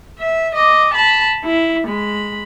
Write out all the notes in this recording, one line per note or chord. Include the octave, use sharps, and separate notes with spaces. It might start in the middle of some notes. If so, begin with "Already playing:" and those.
E5
D#5 D6
A5 B5
E4
G#3 B5